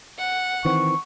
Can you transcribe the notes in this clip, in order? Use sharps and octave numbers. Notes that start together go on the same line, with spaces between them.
F#5
D#3 E3 C4 C#6